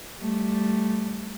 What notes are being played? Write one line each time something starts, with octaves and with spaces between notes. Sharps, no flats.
G3 A3